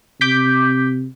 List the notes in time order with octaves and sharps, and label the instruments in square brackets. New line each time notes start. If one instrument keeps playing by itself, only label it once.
[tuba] C3 [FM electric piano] D6 G6 B6